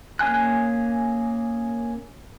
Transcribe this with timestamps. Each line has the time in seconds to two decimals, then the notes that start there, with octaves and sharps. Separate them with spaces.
0.19 A#3 C#4 G#4 G#5 F#6